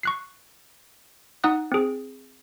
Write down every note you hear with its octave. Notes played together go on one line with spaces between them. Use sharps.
C#6 F#6 C7
D#4 F#5 D#6 F#6
C4 G#4